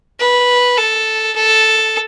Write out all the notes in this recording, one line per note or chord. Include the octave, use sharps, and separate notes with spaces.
B4
A4
A4